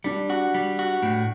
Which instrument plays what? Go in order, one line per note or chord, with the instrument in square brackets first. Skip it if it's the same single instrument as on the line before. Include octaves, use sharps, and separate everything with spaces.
[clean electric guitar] G3 [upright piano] D4
[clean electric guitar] F#4
G3
F#4
A2